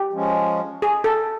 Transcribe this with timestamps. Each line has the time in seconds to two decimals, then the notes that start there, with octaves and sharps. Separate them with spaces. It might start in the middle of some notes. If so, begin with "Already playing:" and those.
Already playing: G4
0.13 F3 G#3 C#4
0.82 G#4
1.04 A4